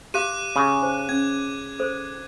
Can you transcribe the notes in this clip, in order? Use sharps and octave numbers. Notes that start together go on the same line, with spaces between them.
G4 F5 D6 F#6 D#7
C#3
D#4 C5
C#4 G#6
A4 C5